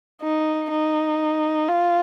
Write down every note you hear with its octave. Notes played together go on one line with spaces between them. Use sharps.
D#4
D#4
F4